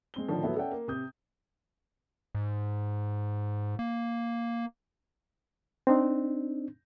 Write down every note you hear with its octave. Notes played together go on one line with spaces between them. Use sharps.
G#3 C4 G7
A2 D3 D#3 F3
F#3 A3 B3 E4
C#4 A4 D5 E5 F#5 G5
A#3
C3 D#6 G6
G#2
A#3
C4 D4 D#4